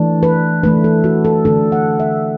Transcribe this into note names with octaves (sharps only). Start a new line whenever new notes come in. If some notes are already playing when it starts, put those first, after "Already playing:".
Already playing: E3 A3 D4
B4
E3 A3 D4 B4
A4
F#4
A4
D3 A3 D4 A4
F#5
E5